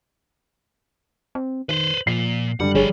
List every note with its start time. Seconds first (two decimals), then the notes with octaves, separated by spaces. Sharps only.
1.35 C4
1.69 D#3 B4 C5
2.07 A#2 F3 C7
2.60 F#2 D3 G3 F#5
2.75 G1 F3 D4 G#4 C#5 D5